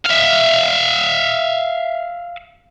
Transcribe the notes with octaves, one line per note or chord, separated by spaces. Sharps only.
E5 F5